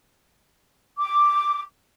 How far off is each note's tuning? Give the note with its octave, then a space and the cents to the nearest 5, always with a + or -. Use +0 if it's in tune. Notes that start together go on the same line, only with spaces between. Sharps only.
D6 +0